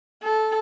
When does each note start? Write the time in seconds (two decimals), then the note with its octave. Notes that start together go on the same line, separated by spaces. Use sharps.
0.23 A4